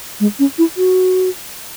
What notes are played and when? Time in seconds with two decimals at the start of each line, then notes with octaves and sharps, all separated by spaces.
0.20 G#3
0.39 C#4
0.58 E4
0.77 F#4